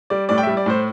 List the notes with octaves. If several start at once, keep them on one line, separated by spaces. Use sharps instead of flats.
G3 D5
A2 D5
G5
G3 E5
D5
A2 C5